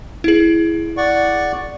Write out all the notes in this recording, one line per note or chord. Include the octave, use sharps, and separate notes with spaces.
E4 G#4
D5 F#5 C#6